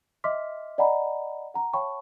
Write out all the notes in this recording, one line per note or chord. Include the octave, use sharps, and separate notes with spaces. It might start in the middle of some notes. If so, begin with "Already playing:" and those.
D#5 E5 C6 D6 F6 B6
D5 D#5 F#5 G#5 A#5 B5
F#5 A#5
C#5 F5 G5 A5 B5 C#6